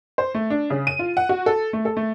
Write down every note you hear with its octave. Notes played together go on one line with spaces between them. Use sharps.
C5
A3
D4
C#3
D#7
F4
F#5
F#4
A4
A3
A4
A3